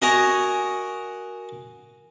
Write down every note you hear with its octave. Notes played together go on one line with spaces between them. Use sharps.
F#4 A#4 D#5 G#5 A#5 C#6